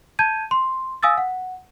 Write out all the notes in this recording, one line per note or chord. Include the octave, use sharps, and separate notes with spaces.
A5 G6 G#6 D#7
C6
F5 G#5 D#6 E6 A6
F#5